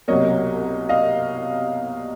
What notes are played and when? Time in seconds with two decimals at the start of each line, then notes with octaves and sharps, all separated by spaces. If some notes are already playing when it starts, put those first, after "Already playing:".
0.08 C2 B2 F#3 A#3 C#5 D#5
0.89 D#5 F5